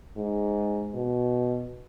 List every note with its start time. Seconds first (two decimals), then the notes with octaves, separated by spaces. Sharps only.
0.17 G#2
0.94 B2